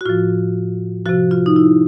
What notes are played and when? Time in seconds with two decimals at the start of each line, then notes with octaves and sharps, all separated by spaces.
0.01 F#4
0.05 A2 F3 F4
1.06 C3 F3 F#4
1.31 F4
1.46 D#4
1.56 E4